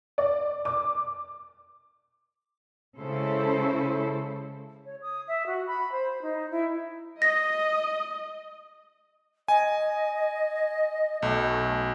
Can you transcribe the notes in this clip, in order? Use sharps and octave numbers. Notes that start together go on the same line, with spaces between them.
D5
D6
C#3 G#3 E4 A4 C5
C#5
D#6
E5
F#4
B5
C5
D#4
E4
D#5 D#6 A#6
D#5 G#5
B1 A3